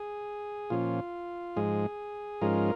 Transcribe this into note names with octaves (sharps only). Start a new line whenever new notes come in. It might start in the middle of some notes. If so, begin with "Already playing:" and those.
Already playing: G#4
A#2 F3 C#4 F4
G#2 F3 G#3 G#4
G#2 F3 G#3 C#4 F4 A#4